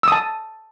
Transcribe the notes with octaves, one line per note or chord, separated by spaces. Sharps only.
A5 D#6 E6